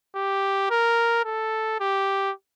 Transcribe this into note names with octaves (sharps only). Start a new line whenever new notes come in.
G4
A#4
A4
G4